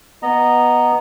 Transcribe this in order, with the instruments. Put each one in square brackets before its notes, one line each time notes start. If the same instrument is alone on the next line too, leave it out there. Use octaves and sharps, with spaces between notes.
[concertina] B3 D#5 A#5